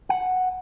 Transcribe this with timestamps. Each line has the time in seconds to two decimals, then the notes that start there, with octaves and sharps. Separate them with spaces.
0.09 F#5